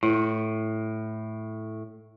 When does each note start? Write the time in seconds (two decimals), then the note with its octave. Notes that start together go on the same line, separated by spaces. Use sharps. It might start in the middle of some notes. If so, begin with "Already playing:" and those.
0.03 A2 E4